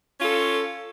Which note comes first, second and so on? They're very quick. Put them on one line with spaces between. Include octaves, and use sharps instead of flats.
C#4 F4 A4